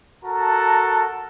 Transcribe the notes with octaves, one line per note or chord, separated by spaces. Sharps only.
F#4 A4 A#4 A5 A#5